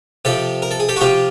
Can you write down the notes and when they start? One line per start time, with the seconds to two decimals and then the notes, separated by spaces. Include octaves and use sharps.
0.25 C3 F3 G4 A4
0.62 A#4
0.71 A4
0.80 G#4
0.89 G4 A4
0.96 F#4
1.01 C3 F3 F4 G4